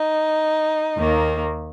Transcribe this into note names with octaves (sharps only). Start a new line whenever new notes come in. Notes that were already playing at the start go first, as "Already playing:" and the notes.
Already playing: D#4
D#2 D#3 A#3